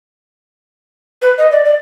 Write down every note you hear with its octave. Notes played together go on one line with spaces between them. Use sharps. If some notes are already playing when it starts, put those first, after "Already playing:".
B4
D#5
D5
D5